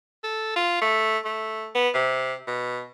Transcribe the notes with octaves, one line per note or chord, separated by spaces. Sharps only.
A4
F4
A3
A3
B3
C3
B2